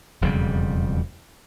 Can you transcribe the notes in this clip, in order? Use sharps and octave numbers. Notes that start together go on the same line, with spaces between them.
E1 F2 C#3 G3